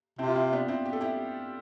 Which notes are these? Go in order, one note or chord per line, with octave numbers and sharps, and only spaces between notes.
C3 C4 E4
F4
C4 E4
B3 D4
C4 E4
G4
A4
E4 G4